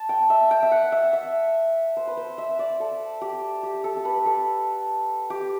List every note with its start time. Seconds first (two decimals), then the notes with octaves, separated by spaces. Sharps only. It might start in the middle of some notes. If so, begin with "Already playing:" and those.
Already playing: A5
0.09 G5
0.30 E5
0.51 G5
0.63 E5
0.72 F#5
0.92 E5
1.13 E5
1.97 C5
2.07 B4
2.17 C5
2.38 E5
2.59 D5
2.80 A4
3.21 G4
3.63 G4
3.84 A4
3.97 A4
4.05 B4
4.26 A4
5.30 G4